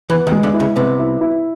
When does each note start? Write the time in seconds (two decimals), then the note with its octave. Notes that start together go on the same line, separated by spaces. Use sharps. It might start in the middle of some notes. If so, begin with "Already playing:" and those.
0.10 E2 E3 B3
0.27 D#2 D#3
0.32 G#3
0.43 D2 D3
0.54 E4
0.60 C#2 C#3
0.76 C2 C3 B3
0.99 E4
1.21 E4